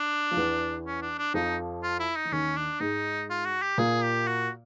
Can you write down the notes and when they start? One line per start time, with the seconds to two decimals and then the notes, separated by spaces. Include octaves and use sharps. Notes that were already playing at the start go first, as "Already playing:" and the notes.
Already playing: D4
0.31 F3
0.37 E2 E3
0.86 C#4
1.01 D4
1.18 D4
1.34 F2 F3 D#4
1.83 F4
1.99 E4
2.15 D#4
2.25 E3
2.32 D#2 D#3 C#4
2.57 D4
2.80 G#2 G#3 D#4
3.30 F4
3.45 F#4
3.62 G4
3.78 A#2 A#3 G#4
4.03 G4
4.27 F#4